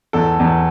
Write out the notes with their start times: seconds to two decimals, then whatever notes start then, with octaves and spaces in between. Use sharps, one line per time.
0.13 E2 A4
0.40 E2